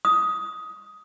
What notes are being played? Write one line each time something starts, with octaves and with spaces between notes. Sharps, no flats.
D#6